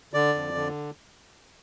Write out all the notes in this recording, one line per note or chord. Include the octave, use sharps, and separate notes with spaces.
D3 D5
F2
D3